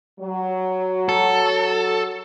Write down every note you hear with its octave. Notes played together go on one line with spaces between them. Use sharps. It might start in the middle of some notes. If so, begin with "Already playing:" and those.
F#3
A4